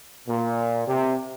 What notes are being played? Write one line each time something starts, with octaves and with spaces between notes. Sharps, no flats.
A#2
C3